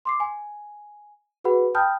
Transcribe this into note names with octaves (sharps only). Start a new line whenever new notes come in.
C6 D6 C7
G#5
F#4 G#4 B4 F#5 B5
G5 A5 B5 D#6 F6 G6